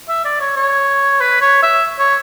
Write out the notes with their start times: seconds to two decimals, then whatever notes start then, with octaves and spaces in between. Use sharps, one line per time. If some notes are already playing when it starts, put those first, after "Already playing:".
0.08 E5
0.25 D5
0.41 C#5
0.56 C#5
1.20 B4
1.41 C#5
1.63 E5
1.99 C#5